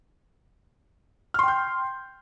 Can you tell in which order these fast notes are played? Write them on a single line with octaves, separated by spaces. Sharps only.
F6 C6 G5 G6